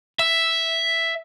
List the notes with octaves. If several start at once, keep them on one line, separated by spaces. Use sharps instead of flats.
E5